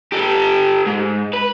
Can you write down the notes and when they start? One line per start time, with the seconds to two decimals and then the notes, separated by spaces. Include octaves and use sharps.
0.12 G4 A4
0.87 G#2
1.33 B4